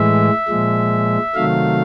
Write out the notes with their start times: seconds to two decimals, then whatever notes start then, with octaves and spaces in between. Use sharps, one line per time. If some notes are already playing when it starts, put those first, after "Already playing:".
Already playing: A2 E3 G#3 E5
0.48 A#2 F3 G#3
1.35 C3 D#3 F#3 A3 F5